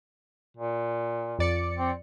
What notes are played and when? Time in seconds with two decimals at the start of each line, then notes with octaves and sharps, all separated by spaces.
0.57 A#2
1.39 F2 D5 C#7
1.79 C4